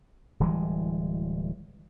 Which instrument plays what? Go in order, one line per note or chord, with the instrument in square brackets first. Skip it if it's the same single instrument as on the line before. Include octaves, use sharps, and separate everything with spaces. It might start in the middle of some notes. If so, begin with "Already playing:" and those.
[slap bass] D1 E3 G3 G#3